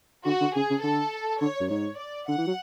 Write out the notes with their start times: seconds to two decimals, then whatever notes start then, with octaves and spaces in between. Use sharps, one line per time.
0.26 D3 F#4
0.41 D3
0.56 C#3 G#4
0.70 C#3
0.84 D3 A4
1.41 D3 C#5
1.61 F#2
1.70 G#2 C#5
1.99 D5
2.28 D3 F#5
2.38 E3
2.47 F#3